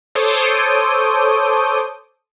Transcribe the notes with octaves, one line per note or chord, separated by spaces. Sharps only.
A4 C5 C#5 D6 D#6 G6